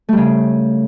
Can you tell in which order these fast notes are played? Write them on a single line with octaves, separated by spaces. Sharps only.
A3 G3 C#3